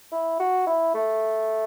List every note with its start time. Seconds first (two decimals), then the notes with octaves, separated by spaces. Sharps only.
0.12 E4
0.39 F#4
0.67 E4
0.94 A3